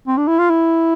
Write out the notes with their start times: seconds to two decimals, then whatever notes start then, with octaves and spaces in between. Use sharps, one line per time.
0.07 C4
0.17 D4
0.28 E4
0.39 F4
0.50 E4